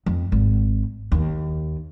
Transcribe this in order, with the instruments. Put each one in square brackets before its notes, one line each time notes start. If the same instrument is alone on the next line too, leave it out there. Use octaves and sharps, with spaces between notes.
[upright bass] F2
G#1
D#2